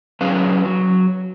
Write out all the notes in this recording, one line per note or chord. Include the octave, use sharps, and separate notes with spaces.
F#3 C#4 G#4 B4 F5
F#3